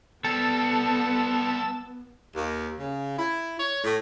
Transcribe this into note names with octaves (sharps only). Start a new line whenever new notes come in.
G3 B3 C4 A4 A5 E6
D#2
C#3
E4
C#5
A2